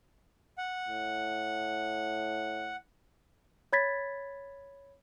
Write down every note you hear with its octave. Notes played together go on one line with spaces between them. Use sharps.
F#5
A2
C#5 B5 G#6 A6 B6